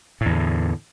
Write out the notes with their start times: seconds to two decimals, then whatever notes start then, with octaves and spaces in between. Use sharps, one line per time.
0.21 A2
0.26 E2
0.31 D3